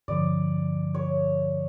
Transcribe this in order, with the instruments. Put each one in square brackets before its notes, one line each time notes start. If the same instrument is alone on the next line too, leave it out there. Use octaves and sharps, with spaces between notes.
[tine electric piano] G2 D3 F3 [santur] D5
[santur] C#5